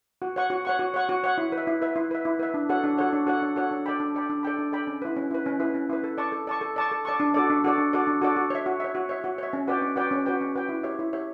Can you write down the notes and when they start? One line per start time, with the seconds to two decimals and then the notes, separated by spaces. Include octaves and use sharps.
0.22 F#4
0.36 C#5 F#5 C#6
0.50 F#4
0.65 C#5 F#5 C#6
0.79 F#4
0.94 C#5 F#5 C#6
1.09 F#4
1.24 C#5 F#5 C#6
1.38 E4
1.52 B4
1.58 E5
1.67 E4
1.82 B4 E5
1.96 E4
2.11 B4 E5
2.25 E4
2.39 B4 E5
2.54 D4
2.69 F#4 A4 C#5 F#5
2.84 D4
2.98 F#4 A4 C#5 F#5
3.13 D4
3.27 F#4 A4 C#5 F#5
3.42 D4
3.56 F#4 A4 C#5 F#5
3.71 D4
3.86 A4 D5 G5 B5
4.00 D4
4.15 A4 D5 G5 B5
4.30 D4
4.43 A4 D5 G5 B5
4.58 D4
4.72 A4 D5 G5 B5
4.87 C#4
5.02 E4 B4
5.16 C#4
5.31 E4 B4
5.46 C#4
5.60 E4 B4
5.75 C#4
5.90 E4 B4
6.04 A4
6.18 D5 A5 C#6
6.32 A4
6.47 D5 A5 C#6
6.61 A4
6.76 D5 A5 C#6
6.91 A4
7.05 D5 A5 C#6
7.20 D4
7.34 F#4 A4 D5
7.50 D4
7.64 F#4 A4 D5
7.78 D4
7.93 F#4 A4 D5
8.07 D4
8.22 F#4 A4 D5
8.36 F#4
8.50 C#5 E5
8.66 F#4
8.80 C#5 E5
8.95 F#4
9.09 C#5 E5
9.24 F#4
9.38 C#5 E5
9.53 C#4
9.68 F#4 B4 D5 G5
9.82 C#4
9.96 F#4 B4 D5 G5
10.11 C#4
10.26 F#4 B4 D5 G5
10.41 C#4
10.55 F#4 B4 D5 G5
10.69 E4
10.83 G4 C#5 E5
10.99 E4
11.13 G4 C#5 E5